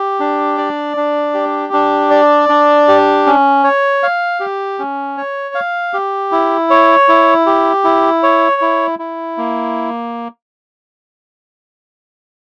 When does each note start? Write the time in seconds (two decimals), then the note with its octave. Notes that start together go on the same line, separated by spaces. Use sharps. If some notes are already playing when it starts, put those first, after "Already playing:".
Already playing: G4
0.20 D4
0.58 D5
0.97 D4
1.34 G4
1.73 D4
2.11 D5
2.49 D4
2.88 G4
3.26 C#4
3.64 C#5
4.03 F5
4.40 G4
4.79 C#4
5.17 C#5
5.55 F5
5.93 G4
6.32 E4
6.70 C#5
7.09 E4
7.46 G4
7.84 E4
8.23 C#5
8.62 E4
8.99 E4
9.37 A#3